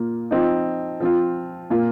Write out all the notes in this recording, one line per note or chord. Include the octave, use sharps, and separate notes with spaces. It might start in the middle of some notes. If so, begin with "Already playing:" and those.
Already playing: A#2 A#3 F4
F3 C4 D#4
F3 C4 F4
A#2 A#3 F4